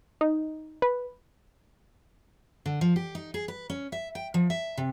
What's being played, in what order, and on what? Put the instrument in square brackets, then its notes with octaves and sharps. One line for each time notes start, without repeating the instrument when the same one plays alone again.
[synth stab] D#4
B4
[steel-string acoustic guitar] D3
F3
G4
D#4
G#4
B4
C#4
E5
G5
F3
E5
C3